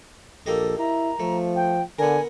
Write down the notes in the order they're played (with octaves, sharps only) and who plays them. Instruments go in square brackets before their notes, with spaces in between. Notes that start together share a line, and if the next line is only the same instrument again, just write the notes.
[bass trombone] A#1 [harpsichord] A#3 G4 D#5 [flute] A4
[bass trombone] E4 [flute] A#5
[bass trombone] F3 [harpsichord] A3
[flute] G5
[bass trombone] D3 [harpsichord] B3 A#4 [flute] G#5